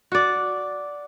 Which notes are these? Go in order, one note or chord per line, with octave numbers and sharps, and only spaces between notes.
F#4 D5